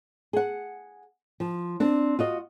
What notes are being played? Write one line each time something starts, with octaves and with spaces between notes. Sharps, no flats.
G#4 F#5
F3
C4 D4
F4 F#4 D#5